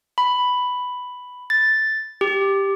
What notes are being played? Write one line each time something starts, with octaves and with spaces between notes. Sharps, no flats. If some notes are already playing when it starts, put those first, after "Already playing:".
B5
A6
G4